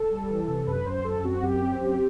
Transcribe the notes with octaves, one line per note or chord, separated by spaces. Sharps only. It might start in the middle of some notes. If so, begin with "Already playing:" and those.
Already playing: A4
G3
E3
C3
F#2 B4
F#2 C5
F#2 A4
C4 F#4
F#2 G4
C4
F#2